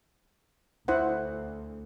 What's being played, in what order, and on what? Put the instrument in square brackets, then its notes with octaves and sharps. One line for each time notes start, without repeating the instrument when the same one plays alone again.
[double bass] D2 [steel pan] E4 C5 F#5